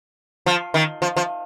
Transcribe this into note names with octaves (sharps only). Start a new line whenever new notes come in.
F3
D#3
F3
F3